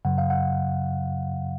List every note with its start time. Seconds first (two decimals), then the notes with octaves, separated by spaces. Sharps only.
0.05 F#2 C#3 F#3 F#5
0.18 F5
0.30 F#5